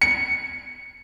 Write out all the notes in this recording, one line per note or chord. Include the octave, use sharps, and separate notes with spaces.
C#7